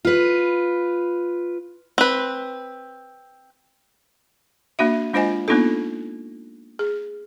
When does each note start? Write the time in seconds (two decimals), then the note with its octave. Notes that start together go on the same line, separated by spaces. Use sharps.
0.05 F4 B4
1.98 C4 B4
4.79 A#3 D4 F#4 E5
5.13 G#3 D4 F4 C5 D#5 G#5
5.48 A#3 B3 D4 D#4 F4 A4
6.79 G#4